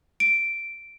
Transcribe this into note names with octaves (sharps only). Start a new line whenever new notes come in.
D7